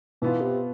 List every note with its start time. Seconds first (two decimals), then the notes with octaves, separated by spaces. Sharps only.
0.22 B2 E3 B3 F4
0.41 C3